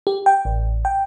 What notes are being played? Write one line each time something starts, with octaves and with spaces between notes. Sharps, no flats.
G4
G5
A1
G5